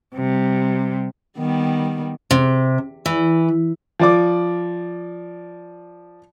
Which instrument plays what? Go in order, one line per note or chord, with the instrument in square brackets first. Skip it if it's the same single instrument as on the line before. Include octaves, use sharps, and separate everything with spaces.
[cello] C3 G3
[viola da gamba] D#3 G3 B3
[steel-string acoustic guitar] C3
E3
[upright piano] F3 D5 D6